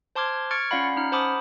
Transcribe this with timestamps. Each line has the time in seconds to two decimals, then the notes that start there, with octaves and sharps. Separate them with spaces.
0.15 C5 A5 C6 D6 F6 G#6
0.51 C#6 F6 G#6 A6 C#7 D7
0.71 C#4 F4 D5 F5 F#5 B5
0.96 C#4 D#4 F6
1.12 C5 F#5 A5 B5 D6 D#6